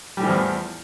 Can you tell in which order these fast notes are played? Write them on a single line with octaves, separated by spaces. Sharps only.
G3 A2 E3 F3 E2